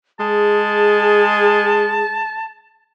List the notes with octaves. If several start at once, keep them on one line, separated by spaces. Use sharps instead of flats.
G#3 G#4 A5